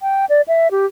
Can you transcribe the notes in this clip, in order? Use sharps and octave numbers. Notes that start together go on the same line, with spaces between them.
G5
D5
E5
G4